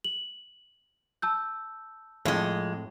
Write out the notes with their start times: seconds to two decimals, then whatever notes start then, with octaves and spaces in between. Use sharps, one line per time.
0.04 F#7
1.22 A5 E6 G6
2.25 F2 A2 G#3